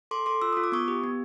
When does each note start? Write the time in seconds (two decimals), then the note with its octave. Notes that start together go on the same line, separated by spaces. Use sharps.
0.11 A4 C6 D6
0.26 A4 C6 D6
0.42 F4 E6
0.53 F4 D#6
0.64 D6
0.72 B3 C#6 D#6
0.88 G4
1.04 B3